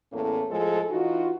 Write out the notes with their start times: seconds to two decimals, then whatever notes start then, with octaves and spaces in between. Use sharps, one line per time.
0.12 E2 A2 A3 A#3 C#4
0.50 A2 F3 G#3 A4
0.90 E3 D#4 F4 F#4